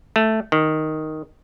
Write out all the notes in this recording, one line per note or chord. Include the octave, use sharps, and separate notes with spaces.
A3
D#3